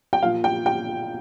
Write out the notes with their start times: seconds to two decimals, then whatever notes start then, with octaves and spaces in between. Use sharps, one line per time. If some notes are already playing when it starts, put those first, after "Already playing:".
0.13 G5
0.22 A#2 F5
0.25 F3
0.44 G5
0.66 G5